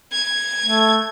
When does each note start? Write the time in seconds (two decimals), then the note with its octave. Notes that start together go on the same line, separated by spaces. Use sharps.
0.10 G#6
0.63 A3